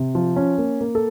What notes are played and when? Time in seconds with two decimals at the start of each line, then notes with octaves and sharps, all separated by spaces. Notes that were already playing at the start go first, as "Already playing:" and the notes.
Already playing: C3
0.15 F3
0.36 C#4
0.58 A#3
0.81 A#3
0.95 A4